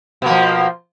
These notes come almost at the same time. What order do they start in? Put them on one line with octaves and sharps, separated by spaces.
B2 A#3 F3